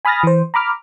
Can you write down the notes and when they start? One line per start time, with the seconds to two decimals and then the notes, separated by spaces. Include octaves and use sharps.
0.05 G#5 B5 D#6 F6 A6 A#6
0.23 E3 C5
0.54 A#5 B5 D6 F6